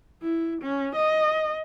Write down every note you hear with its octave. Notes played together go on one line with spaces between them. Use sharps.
E4
C#4
D#5